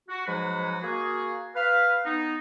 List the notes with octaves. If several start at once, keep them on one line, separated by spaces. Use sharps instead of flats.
F#4
G#2 F3 F#3 G#3 F#4 B4
A#3 F#4 G#4
B4 F5
B3 D#4